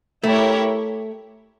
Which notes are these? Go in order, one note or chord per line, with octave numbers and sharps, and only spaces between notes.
A3 E4 G4 A#4 C#5